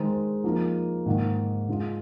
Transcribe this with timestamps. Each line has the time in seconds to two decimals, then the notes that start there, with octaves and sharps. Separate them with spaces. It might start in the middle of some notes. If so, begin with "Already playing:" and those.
Already playing: D#3 G#3 D#4 C5
0.44 F3 A#3 D#4 A#4
1.06 G#2 D#3 A#3
1.68 G#2 G#3 F4